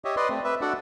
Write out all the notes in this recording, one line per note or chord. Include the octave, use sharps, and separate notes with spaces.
G4 C#5 D#5 E5
B4 D5 D#5 C6
A3 C4
B4 E5
D4 F#4 A4 D5 F#5